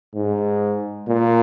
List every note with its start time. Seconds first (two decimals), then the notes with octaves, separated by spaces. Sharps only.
0.15 G#2
1.09 A#2